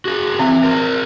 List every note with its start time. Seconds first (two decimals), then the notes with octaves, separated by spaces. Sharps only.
0.05 F#4 G#4
0.39 E3 C4 E5
0.64 A#4 C5